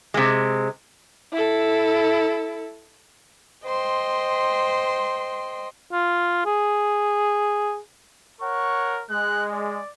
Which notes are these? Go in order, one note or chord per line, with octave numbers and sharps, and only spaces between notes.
C3 G#3
E4 A4
C5 D#5 G5 C6
F4
G#4
A#4 C#5 F#5 C#6
G#3 F#6
D5